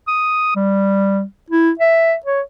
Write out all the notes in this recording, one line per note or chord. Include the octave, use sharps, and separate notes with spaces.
D#6
G3
E4
E5
C#5